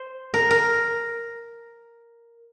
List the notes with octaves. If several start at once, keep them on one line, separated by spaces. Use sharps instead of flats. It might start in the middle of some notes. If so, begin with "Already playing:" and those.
Already playing: C5
A#4
A#4